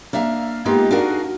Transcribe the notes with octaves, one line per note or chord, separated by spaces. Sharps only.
A#3 D4 E5 F5
G#3 A#3 B3 D#4 F4 G4
D4 D#4 F#4 G#4 A#4 F5